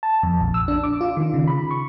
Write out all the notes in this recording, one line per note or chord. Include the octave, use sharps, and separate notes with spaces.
A5
F2
A#1
E6
D4
D6
F4
D#3
C#3
B5
C#6